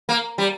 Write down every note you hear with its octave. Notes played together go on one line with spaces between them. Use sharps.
A#3
G3